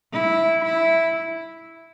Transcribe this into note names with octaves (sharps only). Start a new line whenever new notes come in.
E4
E4